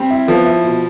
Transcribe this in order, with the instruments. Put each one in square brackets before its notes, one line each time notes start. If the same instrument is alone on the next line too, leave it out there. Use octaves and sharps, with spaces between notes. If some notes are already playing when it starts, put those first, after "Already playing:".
Already playing: [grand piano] G3 [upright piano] C4
[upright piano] E4
[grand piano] F3 [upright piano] B3
[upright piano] E4
B2